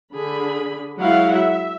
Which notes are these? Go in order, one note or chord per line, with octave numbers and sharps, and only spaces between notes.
D3 G#4 B5
F#3 G#3 E4 F#4 F5 F#5
E5